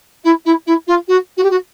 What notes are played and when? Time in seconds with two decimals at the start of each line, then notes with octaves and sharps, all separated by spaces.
0.24 E4
0.45 E4
0.66 E4
0.87 F4
1.08 F#4
1.37 F#4
1.43 G4
1.50 F#4